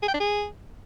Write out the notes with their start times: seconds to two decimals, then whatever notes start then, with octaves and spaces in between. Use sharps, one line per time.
0.02 G#4
0.08 G5
0.14 D4
0.20 G#4